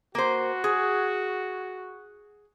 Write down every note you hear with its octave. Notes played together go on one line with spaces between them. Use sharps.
A#3 F#4 C5
G#4